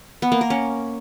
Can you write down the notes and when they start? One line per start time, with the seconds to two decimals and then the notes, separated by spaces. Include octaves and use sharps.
0.22 B3
0.32 A#3
0.41 A#4
0.50 C#4